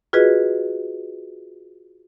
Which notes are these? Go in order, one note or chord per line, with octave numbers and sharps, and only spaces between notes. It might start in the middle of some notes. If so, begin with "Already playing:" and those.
F4 F#4 G#4 B4 D#5